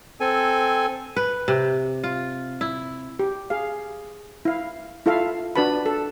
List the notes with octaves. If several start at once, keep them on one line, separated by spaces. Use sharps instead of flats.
C4 A4 G#5
B4
C3
F4
E4
G4
G#4 F5
E4 F5
E4 F4 A4 E5 F5
D4 F#4 B4 A5 B5
A4